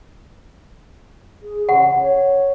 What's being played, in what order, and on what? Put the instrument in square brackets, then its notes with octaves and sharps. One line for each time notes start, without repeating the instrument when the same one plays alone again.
[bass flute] G#4
[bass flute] C#3 [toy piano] F#5
[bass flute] C#5